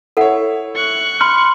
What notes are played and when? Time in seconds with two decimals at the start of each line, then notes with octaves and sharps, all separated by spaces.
0.17 E4 A4 C#5 F#5
0.75 C#6 F#6
1.21 B5 C6 F6